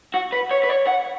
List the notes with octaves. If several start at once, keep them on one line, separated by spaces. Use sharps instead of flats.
F#4
B4
C#5
B4
C#5
F#5